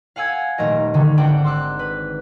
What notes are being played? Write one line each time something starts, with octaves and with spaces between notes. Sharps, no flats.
F5 F#5 G#5 E6 G#6
D#1 A3 A#4 D#5
D3 D#3 G#3 A3
G#1 D4 F#5 G5
C6 D6 E6 F#6
B4